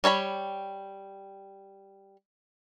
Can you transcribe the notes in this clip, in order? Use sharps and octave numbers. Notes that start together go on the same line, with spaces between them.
G3 C#5 A5 B5